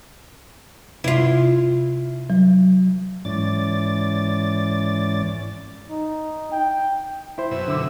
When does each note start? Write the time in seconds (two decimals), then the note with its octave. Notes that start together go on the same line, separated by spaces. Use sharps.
1.04 C3 E4 F4
2.30 F#3
3.25 G#2 E3 C#4 D5 A6
5.90 D#4
6.52 G5
7.38 E4 C5
7.51 F#2 B2 E5
7.68 D3